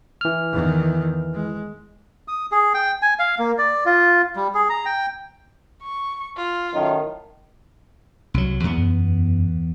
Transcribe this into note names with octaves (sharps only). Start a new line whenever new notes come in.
E3 F6
E2 D#3
G#3
D#6
G#4
G5
G#5
F5
A#3
D5
F4
G3
G#4
A#5
G5
C#6
F4
F#2 A2 D#3
C2 F#3
E2 B3
F#2